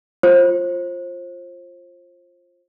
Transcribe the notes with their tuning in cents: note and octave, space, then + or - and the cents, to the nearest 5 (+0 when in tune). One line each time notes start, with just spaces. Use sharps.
F4 +0 C5 +30